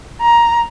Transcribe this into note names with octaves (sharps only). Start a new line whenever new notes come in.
A#5